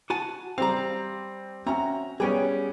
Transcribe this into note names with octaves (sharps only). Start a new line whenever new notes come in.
F#4 G#5 A5
G3 C4 F5 A#5
C4 C#4 F#4 E5 A#5
G3 B3 C#4 G#4 G5